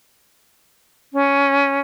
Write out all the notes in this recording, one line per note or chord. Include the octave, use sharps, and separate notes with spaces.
C#4